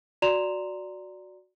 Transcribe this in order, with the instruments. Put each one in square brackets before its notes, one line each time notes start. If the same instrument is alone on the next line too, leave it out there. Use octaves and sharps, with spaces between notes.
[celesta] F#4 D5 A#5 C6 E7 F7